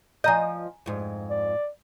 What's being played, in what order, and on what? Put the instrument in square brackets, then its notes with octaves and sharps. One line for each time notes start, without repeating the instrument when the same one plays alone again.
[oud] F3 D#5 [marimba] G#5 A#5 G6
[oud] F2 G#2
[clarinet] D5